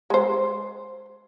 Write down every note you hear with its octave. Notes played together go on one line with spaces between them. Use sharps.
G#3 C5